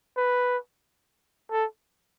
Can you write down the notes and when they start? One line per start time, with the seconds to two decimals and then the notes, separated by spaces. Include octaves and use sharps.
0.17 B4
1.51 A4